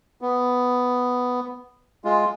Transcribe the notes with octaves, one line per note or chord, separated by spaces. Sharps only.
B3
G#3 F4